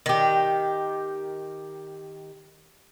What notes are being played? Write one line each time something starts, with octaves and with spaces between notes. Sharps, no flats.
D#3 G4